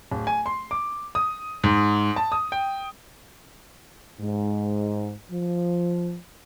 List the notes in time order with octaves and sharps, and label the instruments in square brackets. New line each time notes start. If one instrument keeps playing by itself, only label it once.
[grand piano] D1
G#5
C6
D6
D#6
G#2
A5
D#6
G5
[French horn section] G#2
F3